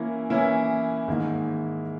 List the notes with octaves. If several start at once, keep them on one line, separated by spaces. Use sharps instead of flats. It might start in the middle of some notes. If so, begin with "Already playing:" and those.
Already playing: E3 A#3 C#4 E4
E3 A#3 C#4 E4
G#2 D#3 A#3 E4